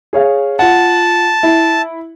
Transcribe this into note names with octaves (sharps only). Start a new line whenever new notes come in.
G#4 C#5 F5
F4 F#5 A5
E4